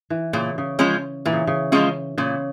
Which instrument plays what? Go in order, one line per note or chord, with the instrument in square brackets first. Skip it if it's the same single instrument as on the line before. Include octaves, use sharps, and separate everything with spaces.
[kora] E3
[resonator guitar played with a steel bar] A#2 [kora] C#3
[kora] C#3
[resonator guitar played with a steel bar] F3 G#3 C#4 F4
[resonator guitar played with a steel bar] A#2 [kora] E3
[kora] C#3
C#3
[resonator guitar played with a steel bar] F3 G#3 C#4 F4
[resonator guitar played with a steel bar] A#2 [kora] C#3